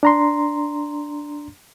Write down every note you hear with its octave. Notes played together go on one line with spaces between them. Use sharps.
D4 A#5 C6